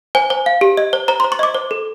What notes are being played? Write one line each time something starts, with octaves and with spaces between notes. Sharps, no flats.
C5 G#5
C5
F5
G4
D#5
C5
C5 A#5
C5 C6
C#6
D#5 D6
C5
A4